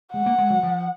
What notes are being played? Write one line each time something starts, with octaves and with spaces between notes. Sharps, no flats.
G#3 F#5
A#3
G#3
F#3
F3